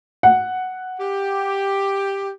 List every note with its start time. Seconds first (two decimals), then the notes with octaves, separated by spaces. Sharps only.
0.23 F#5
1.00 G4